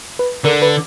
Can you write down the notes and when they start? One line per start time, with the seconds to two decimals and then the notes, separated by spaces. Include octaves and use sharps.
0.19 B4
0.45 D3 A#4
0.62 B4